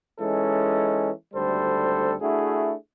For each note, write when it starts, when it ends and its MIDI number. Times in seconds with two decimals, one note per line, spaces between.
0.19 1.10 52
0.19 1.10 56
0.19 1.10 61
0.19 1.10 63
0.19 1.10 69
1.33 2.13 32
1.33 2.13 38
1.33 2.13 55
1.33 2.13 69
1.33 2.13 72
2.20 2.72 57
2.20 2.72 62
2.20 2.72 64
2.20 2.72 66
2.20 2.72 68